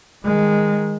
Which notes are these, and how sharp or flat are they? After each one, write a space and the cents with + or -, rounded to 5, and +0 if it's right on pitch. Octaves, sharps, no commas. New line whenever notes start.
D#3 +10 G#3 -10